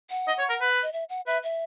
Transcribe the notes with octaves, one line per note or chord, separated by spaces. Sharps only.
F#5
D#5
C#5
A#4
B4
D#5
E5
F#5
B4 E5
E5